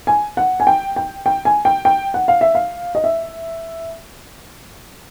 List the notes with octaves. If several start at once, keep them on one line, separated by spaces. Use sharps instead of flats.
G#5
F#5
G#5
G5
G5
G5
G#5
G5
G5
F#5
F5
E5
F5
D#5
E5